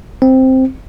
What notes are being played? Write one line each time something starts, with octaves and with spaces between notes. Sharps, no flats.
C4